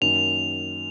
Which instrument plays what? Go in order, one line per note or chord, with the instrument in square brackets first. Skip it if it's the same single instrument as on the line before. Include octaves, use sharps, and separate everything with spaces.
[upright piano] F#2 D#3 A#3 [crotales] F7